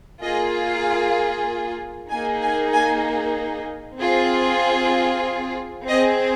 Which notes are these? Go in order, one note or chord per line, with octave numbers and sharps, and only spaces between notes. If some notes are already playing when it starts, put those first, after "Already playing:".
A#3 F4 G#4 D#5
F5
A#3 D#4 G#4 G#5
G#5
G#5
C4 F4 G#4
C4 G#4 D#5